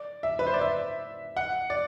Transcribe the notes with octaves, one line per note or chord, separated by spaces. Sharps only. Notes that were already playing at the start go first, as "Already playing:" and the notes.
Already playing: D5
E5
B4
C5
D5
E5
F#5
D5